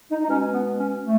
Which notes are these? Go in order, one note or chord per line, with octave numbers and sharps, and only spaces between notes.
D#4
D#4
B2 G#3 C#4
B3
C#4
G#3 A3